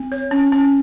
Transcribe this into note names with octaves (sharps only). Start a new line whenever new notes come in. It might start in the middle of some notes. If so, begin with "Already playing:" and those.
Already playing: C4
C#5
C#4
C#4